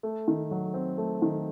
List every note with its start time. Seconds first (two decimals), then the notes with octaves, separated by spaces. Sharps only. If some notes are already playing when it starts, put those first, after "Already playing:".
0.03 A3
0.28 D#3
0.51 F#3
0.74 C4
0.98 A3
1.22 D#3